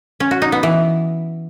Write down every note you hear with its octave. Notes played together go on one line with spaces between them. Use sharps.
C#4
F#4
D#4
B3
E3